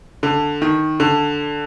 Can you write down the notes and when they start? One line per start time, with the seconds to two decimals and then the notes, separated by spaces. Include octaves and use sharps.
0.23 D3
0.62 D#3
1.00 D3